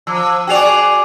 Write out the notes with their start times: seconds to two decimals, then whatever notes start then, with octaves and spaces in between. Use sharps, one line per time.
0.07 F3 A#5 D6 E6
0.47 F#4 G#4 D5 G5 F7